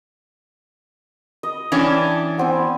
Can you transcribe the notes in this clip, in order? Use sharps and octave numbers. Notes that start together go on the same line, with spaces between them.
D#5
E3 C#4 D4 D5 G5
B3 C4 G#5